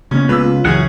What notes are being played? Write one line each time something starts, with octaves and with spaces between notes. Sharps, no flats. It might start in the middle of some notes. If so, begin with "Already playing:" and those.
C#3 A#3 B3 C#4
C#2 F4 B4 E6
C#2 F#2 E3 C#4 G#4 F#5